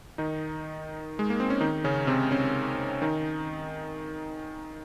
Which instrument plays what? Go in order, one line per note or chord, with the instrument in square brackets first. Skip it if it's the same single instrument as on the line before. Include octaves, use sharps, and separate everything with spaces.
[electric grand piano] D#3 D#4
G#3
A#3
C4
C#4
D#3 D#4
C#3 C#4
C3 C4
C#3 C#4
D#3 D#4